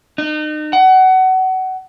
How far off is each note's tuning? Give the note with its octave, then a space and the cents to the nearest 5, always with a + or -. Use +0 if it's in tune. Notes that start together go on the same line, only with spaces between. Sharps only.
D#4 -35
F#5 +25